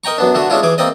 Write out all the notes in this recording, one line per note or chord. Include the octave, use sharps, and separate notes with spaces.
A#4 D#5 G5 A#5 C#6
F#2 B3 D4
D3 A3 D4 F#4
G#3 C#4 D4 E4 F4
E3 G#4 D6
A#3 C4 D5 D#5